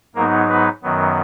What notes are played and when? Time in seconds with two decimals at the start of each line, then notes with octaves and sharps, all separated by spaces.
0.15 G#2 F#3 A#3 B3 D#4 A#4
0.48 B3 B4
0.83 F#2 D#3 F#3 B3